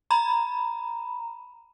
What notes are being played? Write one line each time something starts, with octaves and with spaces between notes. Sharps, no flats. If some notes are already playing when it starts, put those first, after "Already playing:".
A#5 B5